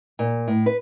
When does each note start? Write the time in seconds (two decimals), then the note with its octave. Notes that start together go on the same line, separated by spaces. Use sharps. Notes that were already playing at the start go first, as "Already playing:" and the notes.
0.19 A#2
0.48 A2
0.66 B4